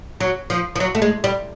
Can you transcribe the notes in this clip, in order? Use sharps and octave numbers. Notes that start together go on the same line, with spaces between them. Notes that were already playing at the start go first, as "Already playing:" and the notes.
F#3
F3
F3
F#3
A3
G#3
G3